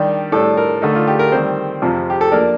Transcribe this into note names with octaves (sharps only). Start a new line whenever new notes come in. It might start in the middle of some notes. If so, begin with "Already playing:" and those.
Already playing: D#3 G3 D4 G4
A2 G3 D4 A4
A#4
D3 A3 D#4
F4
G4
A#4
D#3 G3 C4 C5
F2 C3 F3
G4
A4
F3 A#3 D4 A#4